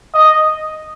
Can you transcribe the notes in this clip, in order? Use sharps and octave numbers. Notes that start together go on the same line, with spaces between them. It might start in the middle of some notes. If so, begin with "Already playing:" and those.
D#5